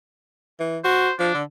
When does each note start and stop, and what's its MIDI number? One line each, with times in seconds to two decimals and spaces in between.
0.60 0.79 52
0.84 1.09 66
0.84 1.13 72
1.20 1.30 53
1.20 1.38 62
1.34 1.43 50